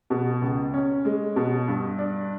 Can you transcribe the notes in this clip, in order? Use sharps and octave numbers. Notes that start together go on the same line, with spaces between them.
B2
C#2
C#4
G#3
B2
G2
D4